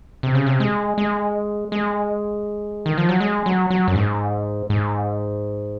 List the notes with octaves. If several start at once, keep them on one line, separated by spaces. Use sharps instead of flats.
C3
C#3
C3
G#3
G#3
G#3
D#3
F3
F#3
G#3
F#3
F#3
F#2
G#2
G#2